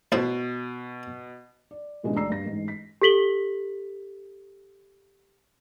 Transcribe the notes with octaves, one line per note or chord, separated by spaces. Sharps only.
A1 B2 E4 C5
D5
G#2 B2 E3 G#3 C#4 D4
D2 D5 A#5 E6 C7
G2 A#6
A1 G#2
B6
G4 A4 B6 F#7 G7